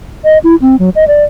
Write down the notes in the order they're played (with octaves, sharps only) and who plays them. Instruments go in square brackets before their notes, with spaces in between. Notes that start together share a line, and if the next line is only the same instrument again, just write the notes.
[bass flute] D#5
E4
C4
F#3
D#5
D5